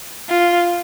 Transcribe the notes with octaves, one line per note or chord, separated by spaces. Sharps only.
F4